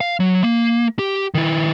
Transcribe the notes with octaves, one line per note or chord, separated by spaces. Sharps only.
F5
F#3
A#3
G4
D#3 E4